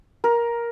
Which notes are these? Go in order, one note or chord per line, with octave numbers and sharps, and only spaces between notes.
A#4